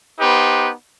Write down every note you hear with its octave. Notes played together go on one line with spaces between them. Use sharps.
B3 D#4 G4 B4 C5